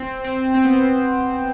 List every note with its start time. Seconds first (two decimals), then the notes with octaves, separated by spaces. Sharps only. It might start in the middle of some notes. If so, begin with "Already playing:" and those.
Already playing: C4
0.24 C4
0.54 C4
0.65 B3